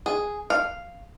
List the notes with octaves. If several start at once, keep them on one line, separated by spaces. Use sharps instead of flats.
G#4
F5